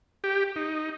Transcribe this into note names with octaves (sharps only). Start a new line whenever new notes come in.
G4
D#4